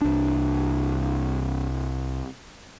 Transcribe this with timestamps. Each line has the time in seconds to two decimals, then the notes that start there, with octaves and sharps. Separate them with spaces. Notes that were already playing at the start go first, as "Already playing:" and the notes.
0.01 C2 D4